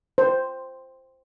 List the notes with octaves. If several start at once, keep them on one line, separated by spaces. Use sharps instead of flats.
C5